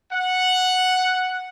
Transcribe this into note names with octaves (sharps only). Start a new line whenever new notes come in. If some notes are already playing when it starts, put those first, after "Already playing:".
F#5